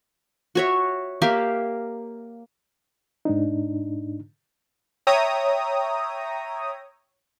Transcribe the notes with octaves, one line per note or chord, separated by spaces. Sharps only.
F#4 C#5 E5
A#3 G4 E5 F5
G#2 D4 D#4
C#5 E5 G5 A#5 D#6